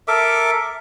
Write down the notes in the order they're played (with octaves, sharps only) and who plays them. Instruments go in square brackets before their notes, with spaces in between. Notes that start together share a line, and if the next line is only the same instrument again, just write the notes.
[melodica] A4 A#4 E5 D6